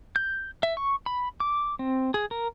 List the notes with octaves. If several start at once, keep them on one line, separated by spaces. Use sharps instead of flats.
G6
E5
C#6
B5
D6
C4
G#4
A#4